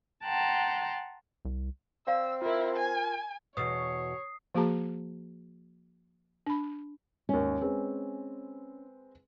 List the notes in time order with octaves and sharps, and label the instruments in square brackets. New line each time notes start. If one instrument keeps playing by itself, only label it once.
[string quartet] F#5 G5 A5 A#5 C6
[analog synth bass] C2
[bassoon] C4 [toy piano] D5 F5 A#5 [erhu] E6
[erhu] E4 [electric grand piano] F4 A#4
[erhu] G#5
[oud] E2 B2 [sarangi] C#5 [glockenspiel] D#6 C7
[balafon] F3 A#3 F#4 G#4 A5 A#5
D4 B5
[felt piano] G#1 D#2 [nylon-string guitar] C#4
[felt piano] G#3 C4 B4